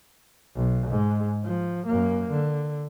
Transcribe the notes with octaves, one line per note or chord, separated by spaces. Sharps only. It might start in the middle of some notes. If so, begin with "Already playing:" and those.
B1
G#2 G#3
F3
F#2 A#3
D3